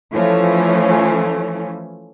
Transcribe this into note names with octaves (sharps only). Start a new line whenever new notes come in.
E3 F3 A3 C#4